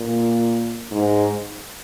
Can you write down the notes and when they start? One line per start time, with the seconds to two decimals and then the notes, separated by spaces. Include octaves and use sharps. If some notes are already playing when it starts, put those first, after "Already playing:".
Already playing: A#2
0.91 G#2